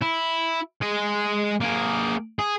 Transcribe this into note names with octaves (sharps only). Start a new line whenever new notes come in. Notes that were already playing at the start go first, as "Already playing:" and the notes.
E4
G#3 G#4
A#3 G#4
G#4